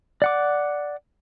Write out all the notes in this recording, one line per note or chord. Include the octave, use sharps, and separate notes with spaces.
D5 F#5 D6